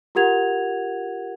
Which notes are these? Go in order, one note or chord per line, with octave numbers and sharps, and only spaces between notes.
F4 G4 A#4 F#5 G#6 F7